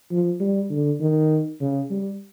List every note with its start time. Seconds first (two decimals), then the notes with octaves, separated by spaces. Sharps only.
0.11 F3
0.40 G3
0.71 D3
1.00 D#3
1.61 C#3
1.90 G3